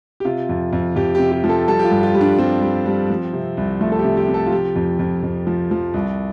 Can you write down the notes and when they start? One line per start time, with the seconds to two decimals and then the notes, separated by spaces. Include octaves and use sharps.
0.20 G4
0.25 C3 F4
0.49 F2
0.73 F2
0.96 F2 G4
1.15 C3 G4
1.32 G4
1.44 F3
1.49 A4
1.67 G3 A4
1.79 G4
1.85 F4
1.91 G2
2.03 F4
2.15 G3
2.21 D4
2.39 G3 C4
2.62 G3
2.86 G3
3.10 F3
3.33 C3
3.57 C2
3.81 F3 A3
3.92 A4
3.99 G4
4.04 C3
4.17 G4
4.29 C3
4.34 A4
4.47 F4
4.52 F3 G4
4.76 F2
4.99 F2
5.23 F2
5.47 F3
5.71 F3
5.94 C2